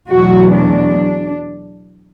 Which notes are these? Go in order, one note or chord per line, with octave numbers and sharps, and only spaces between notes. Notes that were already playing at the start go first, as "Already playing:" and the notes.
E2 B2 F#3 A3 F#4
D4